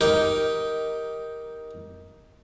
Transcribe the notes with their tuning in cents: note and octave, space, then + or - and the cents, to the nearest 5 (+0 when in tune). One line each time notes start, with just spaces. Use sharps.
D#4 +10 G4 +0 A#4 +0